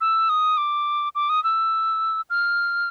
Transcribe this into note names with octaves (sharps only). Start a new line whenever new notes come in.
E6
D#6
D6
D6
D#6
E6
F6